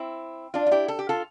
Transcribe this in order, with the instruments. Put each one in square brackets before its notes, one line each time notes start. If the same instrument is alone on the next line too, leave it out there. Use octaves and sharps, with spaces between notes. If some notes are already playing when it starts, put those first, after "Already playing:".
Already playing: [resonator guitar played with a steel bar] C4 E4
D4 F4
F4
E4 G4
A4
G4
F4 A4